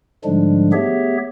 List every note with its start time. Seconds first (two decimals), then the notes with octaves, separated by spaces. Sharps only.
0.25 G#2 D3 F3 G3 G#3 D4
0.73 A3 B3 G4 G#4 C#5 E5